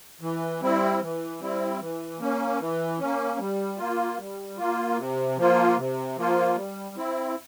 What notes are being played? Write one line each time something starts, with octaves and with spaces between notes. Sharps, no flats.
E3
G3 C4 E4
E3
G3 C4 E4
E3
A#3 C#4
E3
A#3 C#4
G3
A#3 F4
G3
A#3 F4
C3
F3 A#3 F4
C3
F3 A#3 F4
G3
C4 E4